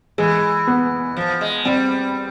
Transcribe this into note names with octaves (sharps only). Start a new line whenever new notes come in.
E3 G#3
B3
F3
G#3
G3 C4